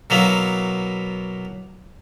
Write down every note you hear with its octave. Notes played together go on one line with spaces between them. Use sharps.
B2 F#3 A#3 B3 E4